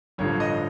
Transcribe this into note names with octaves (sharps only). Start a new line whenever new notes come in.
A1 G2 D3 F3 C#5
D#5